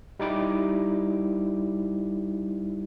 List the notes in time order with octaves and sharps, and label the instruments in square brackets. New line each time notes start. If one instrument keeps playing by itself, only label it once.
[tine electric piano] G3 D#4 E4 D6